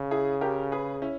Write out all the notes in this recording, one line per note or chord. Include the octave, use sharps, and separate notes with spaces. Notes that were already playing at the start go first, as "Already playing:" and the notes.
Already playing: C#3
E4 G#4
G4 A#4
G#4 B4
C#4 E4